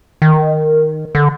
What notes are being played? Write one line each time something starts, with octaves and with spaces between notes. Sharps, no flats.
D#3
D3